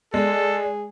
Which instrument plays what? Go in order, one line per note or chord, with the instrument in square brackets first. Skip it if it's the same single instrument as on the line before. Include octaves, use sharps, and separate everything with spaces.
[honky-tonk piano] G#3 [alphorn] G#4 [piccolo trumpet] A4 [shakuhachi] D5